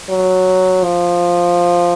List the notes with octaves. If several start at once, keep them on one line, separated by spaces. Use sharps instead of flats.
F#3
F3